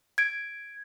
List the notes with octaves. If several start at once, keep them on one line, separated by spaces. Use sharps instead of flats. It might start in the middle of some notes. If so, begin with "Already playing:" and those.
G#6 D7